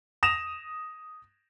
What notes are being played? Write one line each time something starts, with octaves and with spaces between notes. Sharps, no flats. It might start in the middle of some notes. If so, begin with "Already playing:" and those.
D#6 A#6 E7 F7